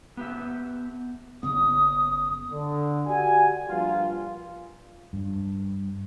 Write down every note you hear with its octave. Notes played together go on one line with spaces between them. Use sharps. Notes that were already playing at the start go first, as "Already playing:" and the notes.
B3 G4 E5
F#1 C#3 B3 D#6
D3
F#4 G4 D5 F#5 G#5
G2 A#2 F3 G3 F4
G2